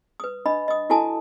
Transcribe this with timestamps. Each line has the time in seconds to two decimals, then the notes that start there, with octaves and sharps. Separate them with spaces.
0.20 B4 D#6
0.45 D4 D#5 B5
0.68 D#5 D#6
0.90 E4 F#4 A4 G#5 A5 D#6